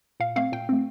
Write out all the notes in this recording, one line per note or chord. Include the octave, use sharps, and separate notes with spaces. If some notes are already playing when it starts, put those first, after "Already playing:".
A#2 F5
A3 C4 F5
A#2 G5
A3 C4